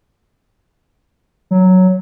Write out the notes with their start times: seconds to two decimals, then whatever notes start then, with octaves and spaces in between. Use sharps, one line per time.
1.51 F#3